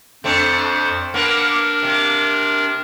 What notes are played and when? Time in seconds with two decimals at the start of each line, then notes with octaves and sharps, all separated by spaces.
0.24 F2 A3 C4 D4 C5
1.14 A#3 B3 D4 A#4
1.82 C3 A#3